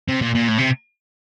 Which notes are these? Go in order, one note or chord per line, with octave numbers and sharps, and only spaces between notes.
C3
A#2
A#2
A2
C3